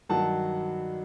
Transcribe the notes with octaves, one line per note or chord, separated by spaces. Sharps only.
G2 D#3 F#3 F#5 A5